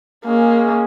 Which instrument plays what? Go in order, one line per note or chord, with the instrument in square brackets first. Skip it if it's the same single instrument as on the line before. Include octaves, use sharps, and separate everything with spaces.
[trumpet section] G#3 C#4 G#4 [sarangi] A#3